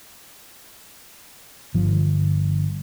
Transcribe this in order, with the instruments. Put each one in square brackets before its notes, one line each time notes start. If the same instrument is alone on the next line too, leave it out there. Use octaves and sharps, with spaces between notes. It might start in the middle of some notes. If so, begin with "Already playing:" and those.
[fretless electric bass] G1 F3